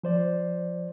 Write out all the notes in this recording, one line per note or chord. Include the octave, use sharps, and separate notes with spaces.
F3 C5 D5